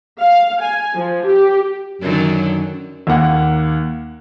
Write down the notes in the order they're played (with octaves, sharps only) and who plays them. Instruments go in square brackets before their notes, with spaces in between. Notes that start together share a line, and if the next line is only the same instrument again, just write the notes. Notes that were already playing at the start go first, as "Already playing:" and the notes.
[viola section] F5
G#5
F3
G4
[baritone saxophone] F#2 [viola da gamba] D3 D#3 F#3
[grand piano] D#2 A#3 F#5